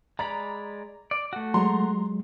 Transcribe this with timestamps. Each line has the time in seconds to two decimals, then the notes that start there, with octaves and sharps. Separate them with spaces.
0.19 G#3 D5 A#5 B5
1.11 D5
1.33 A3 F#4
1.54 F#3 G#3 A#5 C6